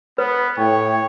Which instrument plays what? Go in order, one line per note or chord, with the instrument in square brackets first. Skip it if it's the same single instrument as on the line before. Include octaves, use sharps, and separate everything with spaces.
[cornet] B3 [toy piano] B4
[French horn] A2 [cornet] C#5 [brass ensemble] G5